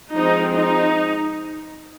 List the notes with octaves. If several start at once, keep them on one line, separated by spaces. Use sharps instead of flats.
F3 G#3 C4 D#4
D#4